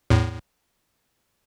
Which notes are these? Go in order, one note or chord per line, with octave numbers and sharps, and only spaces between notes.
E2 A2